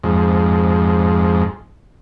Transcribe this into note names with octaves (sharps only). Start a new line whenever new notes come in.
F2 G#2